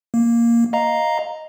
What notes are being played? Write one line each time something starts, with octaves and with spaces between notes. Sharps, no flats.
A#3
D#5 F5 A#5